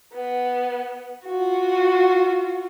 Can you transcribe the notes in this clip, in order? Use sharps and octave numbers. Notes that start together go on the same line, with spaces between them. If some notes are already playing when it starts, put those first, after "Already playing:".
B3
F4 F#4